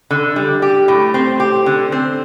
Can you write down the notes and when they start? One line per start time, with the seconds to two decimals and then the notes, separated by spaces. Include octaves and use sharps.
0.11 D3
0.36 G3
0.62 G4
0.88 A2
1.14 C4
1.40 G4
1.66 D3
1.92 C4